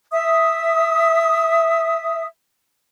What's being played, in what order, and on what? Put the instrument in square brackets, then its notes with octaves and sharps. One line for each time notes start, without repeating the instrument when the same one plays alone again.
[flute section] E5 D#6